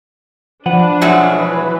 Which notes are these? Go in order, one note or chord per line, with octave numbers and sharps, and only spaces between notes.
F3 D4 B4 F#5
B2 F#3 G#3 E5
E3 B4